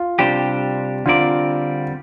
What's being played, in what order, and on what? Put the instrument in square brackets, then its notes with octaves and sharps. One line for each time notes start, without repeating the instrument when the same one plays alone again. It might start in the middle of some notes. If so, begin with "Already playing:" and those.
Already playing: [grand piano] F4
[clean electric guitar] C3 G3 D4 G4 C5
[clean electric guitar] D3 G3 C4 A#4 D5 [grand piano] F4